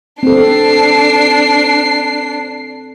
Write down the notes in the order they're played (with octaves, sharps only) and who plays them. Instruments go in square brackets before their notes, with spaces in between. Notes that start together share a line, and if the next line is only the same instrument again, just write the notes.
[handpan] C4 A4 [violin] D4 C7